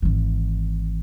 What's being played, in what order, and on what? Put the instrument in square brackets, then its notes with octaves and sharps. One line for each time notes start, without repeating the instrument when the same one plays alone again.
[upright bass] G#1 E3